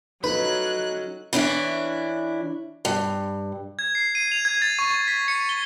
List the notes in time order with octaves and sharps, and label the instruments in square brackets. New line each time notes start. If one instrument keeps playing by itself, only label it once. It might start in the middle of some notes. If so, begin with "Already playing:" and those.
[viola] F#3 C#4 [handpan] D#4 F4 A4 [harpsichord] B4 [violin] F#6
[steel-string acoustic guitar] E3 C#4 D4 E4
G2
[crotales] G#6
C7
D#7
F7
G#6
A6
C#6
B6
C#7
G7